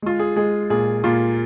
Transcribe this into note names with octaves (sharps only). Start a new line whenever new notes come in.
G#3 F4
G#4
G#3 G#4
A#2 G#4
A#2 F4